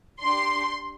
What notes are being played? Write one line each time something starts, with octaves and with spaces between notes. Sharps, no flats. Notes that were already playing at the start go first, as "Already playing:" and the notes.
D4 G4 C6